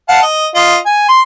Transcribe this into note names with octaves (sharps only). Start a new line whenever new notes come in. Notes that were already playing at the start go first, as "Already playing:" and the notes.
F5 F#5 A5
D#5
F4 D#5
G#5
C6